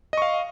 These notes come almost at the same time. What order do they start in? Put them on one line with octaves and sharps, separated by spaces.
D#5 C#6 F5